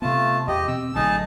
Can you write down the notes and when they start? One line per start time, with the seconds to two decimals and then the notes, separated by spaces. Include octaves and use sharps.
0.02 C3 A3 B3 F4 A5
0.47 E2 G4 D#5
0.68 B2 C4 E6
0.95 A1 D3 F#3 D#4 G#4 A5